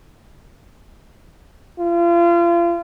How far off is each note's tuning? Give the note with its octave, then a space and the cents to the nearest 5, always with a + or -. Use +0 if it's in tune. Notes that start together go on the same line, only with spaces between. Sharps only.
F4 -35